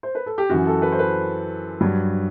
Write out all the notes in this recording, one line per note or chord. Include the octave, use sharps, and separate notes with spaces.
C5
B4
A4
G4
F#2 E3 F#4
A4
B4
C5
B4
G2 F#3